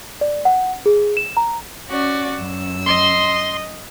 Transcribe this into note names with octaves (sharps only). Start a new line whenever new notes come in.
D5
F#5
G#4
E7
A#5
C#4 F#4 D5
F#2 E6
D#5 C6